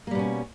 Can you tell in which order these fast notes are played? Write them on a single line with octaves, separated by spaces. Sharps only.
A#3 G3 B2 C#4